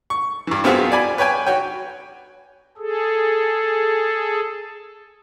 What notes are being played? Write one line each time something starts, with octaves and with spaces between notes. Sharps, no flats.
C#6
G2 E3
F#2 B3 C4 F4 F#4 G#4
D5 G#5 B5
B4 C#5 G5 G#5
F#4 C#5 G5
G#4 A4